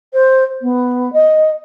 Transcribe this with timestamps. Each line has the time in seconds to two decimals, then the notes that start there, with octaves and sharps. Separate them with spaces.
0.13 C5
0.62 B3
1.13 D#5